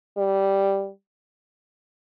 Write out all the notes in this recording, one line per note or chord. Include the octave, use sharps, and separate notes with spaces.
G3